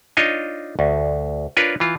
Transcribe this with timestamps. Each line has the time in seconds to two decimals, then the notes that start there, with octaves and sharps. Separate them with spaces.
0.17 D4 D#4 F4 C#5 D#5
0.79 D2
1.57 D4 F4 A#4 B4 C#5
1.80 E3 F4